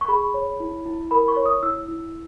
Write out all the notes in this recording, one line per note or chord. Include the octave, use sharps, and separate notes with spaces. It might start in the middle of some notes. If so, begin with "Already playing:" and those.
C#6
G#4 B5
C#5
E4
E4
A#4 B5
C#6
C#5
D#6
E4 E6
E4